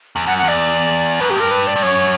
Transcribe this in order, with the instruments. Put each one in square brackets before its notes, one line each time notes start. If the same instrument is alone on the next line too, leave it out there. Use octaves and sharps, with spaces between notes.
[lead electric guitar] E2
[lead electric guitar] F#2 [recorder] F#5
[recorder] F#5
[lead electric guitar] E2
[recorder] D5
[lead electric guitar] F#2 [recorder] B4
[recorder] G4
[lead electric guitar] G2 [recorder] A#4
[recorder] B4
D5
[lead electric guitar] G2
[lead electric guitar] F#2 [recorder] C#5